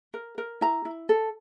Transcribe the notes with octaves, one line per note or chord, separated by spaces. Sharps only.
A#4
A#4
E4 A#5
E4
A4